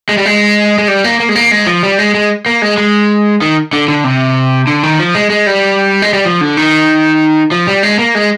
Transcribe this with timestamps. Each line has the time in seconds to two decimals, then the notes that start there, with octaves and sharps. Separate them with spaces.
0.09 G#3
0.17 G3
0.26 G#3
0.78 G#3
0.88 G3
1.04 A#3
1.20 A#3
1.29 G#3
1.35 A#3
1.51 G#3
1.67 F3
1.83 G3
1.99 G#3
2.14 G#3
2.46 A#3
2.62 G#3
2.78 G#3
3.41 D#3
3.73 D3
3.88 D3
4.04 C3
4.67 D3
4.83 D#3
4.99 F3
5.15 G#3
5.30 G#3
5.47 G3
6.02 G#3
6.13 G3
6.25 F3
6.41 D3
6.57 D#3
7.52 F3
7.67 G3
7.83 G#3
7.99 A#3
8.15 G#3